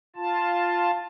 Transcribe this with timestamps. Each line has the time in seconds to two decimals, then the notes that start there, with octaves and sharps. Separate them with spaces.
0.16 F4 A5